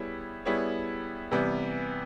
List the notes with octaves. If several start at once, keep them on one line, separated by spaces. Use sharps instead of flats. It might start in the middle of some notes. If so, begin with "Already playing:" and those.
Already playing: G3 B3 E4 G#4 C#5
G3 B3 E4 G#4 C#5
C3 E3 G3 B3